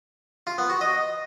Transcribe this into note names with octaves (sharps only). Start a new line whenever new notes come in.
F4
B3
F#4
D#5